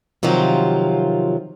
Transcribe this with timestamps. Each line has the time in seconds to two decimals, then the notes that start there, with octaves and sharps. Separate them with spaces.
0.23 C3 D#3 F3 F#3 F4